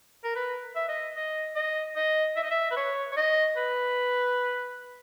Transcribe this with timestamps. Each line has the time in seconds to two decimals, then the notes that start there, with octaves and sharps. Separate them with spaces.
0.24 A#4
0.35 B4
0.76 E5
0.89 D#5
1.15 D#5
1.56 D#5
1.96 D#5
2.36 E5
2.43 D#5
2.51 E5
2.71 B4
2.77 C#5
3.12 C#5
3.16 D#5
3.56 B4